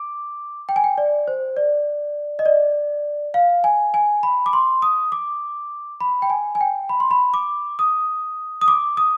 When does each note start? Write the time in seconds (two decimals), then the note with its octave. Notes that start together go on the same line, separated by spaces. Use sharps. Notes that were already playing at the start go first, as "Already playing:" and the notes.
Already playing: D6
0.69 G5
0.76 G#5
0.84 G5
0.98 D5
1.28 C5
1.57 D5
2.39 D#5
2.46 D5
3.34 F5
3.64 G#5
3.94 G#5
4.23 B5
4.46 D6
4.53 C6
4.82 D#6
5.12 D6
6.01 B5
6.22 G5
6.30 G#5
6.55 G#5
6.61 G5
6.89 B5
7.00 C6
7.11 B5
7.34 D6
7.79 D#6
8.61 D#6
8.68 D6
8.97 D#6